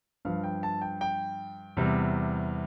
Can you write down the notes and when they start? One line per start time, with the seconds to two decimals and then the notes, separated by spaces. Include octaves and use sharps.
0.25 G2 F3 F5
0.44 G5
0.63 A5
0.82 G5
1.01 G5
1.77 E2 C3 G3